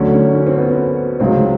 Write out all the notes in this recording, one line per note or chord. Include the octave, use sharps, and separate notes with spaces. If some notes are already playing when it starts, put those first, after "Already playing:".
Already playing: D2 D3 F#3 C#4
C#4
C#4
C4
B3
C4
C#2 C#3 F#3 C4